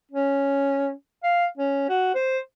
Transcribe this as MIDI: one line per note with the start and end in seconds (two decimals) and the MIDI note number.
0.11 0.91 61
1.23 1.46 77
1.58 1.85 61
1.89 2.10 66
2.15 2.39 72